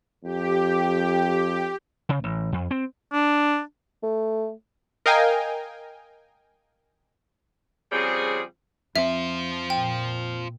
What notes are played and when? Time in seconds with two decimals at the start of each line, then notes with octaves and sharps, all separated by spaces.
0.24 F2 G4
2.09 C#3
2.24 A1
2.52 F2
2.71 C4
3.13 D4
4.03 A3
5.06 A#4 D#5 F5 G5 G#5
7.92 C#3 F3 G3 C4 G#4
8.96 F2 C4 F4 C5 E5
9.70 A#2 G5